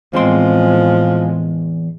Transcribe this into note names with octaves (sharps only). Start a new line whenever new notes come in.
E2 A2 F3 G#3 C4 C6